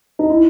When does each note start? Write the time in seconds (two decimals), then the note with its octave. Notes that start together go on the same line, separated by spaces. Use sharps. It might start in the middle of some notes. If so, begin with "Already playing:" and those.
0.19 D#4
0.30 E4